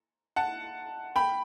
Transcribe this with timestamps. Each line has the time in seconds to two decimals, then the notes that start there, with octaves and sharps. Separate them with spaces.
0.36 F#5 A5
1.16 G5 B5